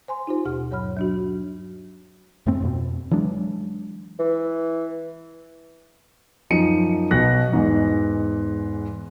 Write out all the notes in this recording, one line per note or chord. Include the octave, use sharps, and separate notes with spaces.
C5 G#5 C6
D#4 F4 G4 C5
D#2 B2 F4 G4 F#5 F6
G2 F#3 C#5 F#5 B5 F6
F#3 D4 F#4
F2 G#2 A3 C4
F2 B2
E3 F#3 G#3 D4
E3
F#2 F3 D#4 C#7 D#7
B1 B2 F#6 A#6
E2 G#2